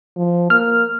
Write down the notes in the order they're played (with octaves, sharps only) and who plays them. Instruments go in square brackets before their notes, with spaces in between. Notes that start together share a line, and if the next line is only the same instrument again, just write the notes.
[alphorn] F3
[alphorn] A#3 [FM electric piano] F6